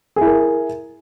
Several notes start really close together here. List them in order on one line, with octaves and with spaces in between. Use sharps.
G#4 E4 A#4